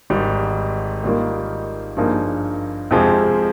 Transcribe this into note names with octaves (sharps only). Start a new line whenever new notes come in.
G#1 G#2 G3
G#2 D#3 G3 A#3 F4
G2 F3 A#3 D#4 G#4
F2 C3 F3 G#3